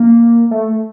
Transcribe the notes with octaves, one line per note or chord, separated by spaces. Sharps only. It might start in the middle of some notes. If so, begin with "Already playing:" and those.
Already playing: A#3
A3